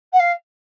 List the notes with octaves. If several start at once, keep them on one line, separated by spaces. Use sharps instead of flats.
F#5
F5